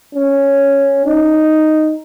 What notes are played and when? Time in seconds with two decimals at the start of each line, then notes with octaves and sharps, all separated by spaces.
0.14 C#4
1.05 D#4